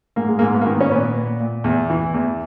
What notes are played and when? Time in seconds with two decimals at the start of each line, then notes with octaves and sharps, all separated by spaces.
0.16 G#2 A#3
0.28 G#3
0.39 A#3
0.42 G#2
0.54 B3
0.61 A#3
0.66 D#3 B3
0.81 C#4
0.91 A#2 B3
1.15 A#2
1.40 A#2
1.64 E2
1.90 E3
2.14 E2